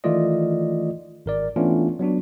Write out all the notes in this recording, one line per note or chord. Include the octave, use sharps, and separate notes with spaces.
D#3 E3 A3 F4 D5 D#5
G#1 A#4 D5
E3 A3 B3 C#4 D4 F4
F#3 B3 D4 F#4